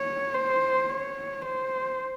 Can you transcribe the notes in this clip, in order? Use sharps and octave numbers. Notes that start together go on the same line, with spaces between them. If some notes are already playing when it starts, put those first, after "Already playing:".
Already playing: C#5
C5
C#5
C5